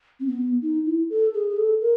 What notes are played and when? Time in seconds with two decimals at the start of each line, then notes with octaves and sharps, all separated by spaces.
0.20 C4
0.27 B3
0.62 D#4
0.86 E4
1.10 A4
1.34 G#4
1.50 G#4
1.57 A4
1.81 A#4